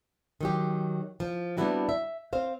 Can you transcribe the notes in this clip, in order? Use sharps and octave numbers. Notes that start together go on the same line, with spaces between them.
D#3 F#3 G4
F3
G3 B3 C4 D4 E4 F#4
E5
C4 C5 F5